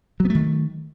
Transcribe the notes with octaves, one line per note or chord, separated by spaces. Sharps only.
D#3 F#3 A3 B3